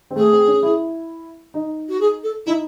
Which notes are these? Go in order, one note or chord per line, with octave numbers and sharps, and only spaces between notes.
C4
A3 G#4
C4
C#4
E4
D#4
F#4
G#4
A4
D#4 E4